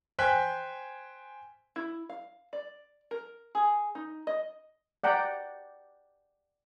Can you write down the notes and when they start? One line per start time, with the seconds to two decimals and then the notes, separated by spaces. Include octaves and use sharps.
0.19 C5 G5 G#5 F#6 B6
1.76 E4
2.09 F5
2.53 D5
3.11 A#4
3.55 G#4
3.95 D#4
4.27 D#5
5.04 D5 F#5 G5 A#5